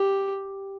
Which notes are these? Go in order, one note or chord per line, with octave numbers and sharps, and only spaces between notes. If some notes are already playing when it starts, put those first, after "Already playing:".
Already playing: G4